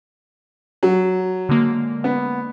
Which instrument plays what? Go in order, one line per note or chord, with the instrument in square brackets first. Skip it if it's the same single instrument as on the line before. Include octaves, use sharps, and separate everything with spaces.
[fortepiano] F#3
[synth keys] D3 G#3 A#3
[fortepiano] B3